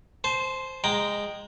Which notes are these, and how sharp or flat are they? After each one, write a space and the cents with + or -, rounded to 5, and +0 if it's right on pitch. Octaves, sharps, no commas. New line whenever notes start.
C5 +0 A5 -35
G#3 -15 G5 +0 A#5 +0